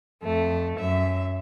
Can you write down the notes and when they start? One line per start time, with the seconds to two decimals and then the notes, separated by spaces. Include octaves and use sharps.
0.23 F2 A3
0.78 F#2 E5